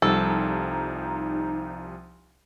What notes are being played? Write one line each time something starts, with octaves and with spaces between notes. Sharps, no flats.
C2 F3 G3 D#4 A4